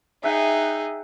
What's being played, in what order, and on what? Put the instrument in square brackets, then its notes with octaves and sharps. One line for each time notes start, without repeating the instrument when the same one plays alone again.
[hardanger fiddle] D#4 G#4 [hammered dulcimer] E5 F#5 G5